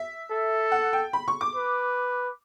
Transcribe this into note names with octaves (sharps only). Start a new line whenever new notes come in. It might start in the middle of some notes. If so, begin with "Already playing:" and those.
Already playing: E5
A4
F#5
G5
B5
C#6
D6
B4